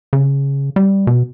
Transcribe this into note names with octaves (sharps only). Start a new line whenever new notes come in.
C#3
G3
B2